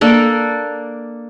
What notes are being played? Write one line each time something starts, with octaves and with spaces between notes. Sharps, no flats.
A#3 D4 A4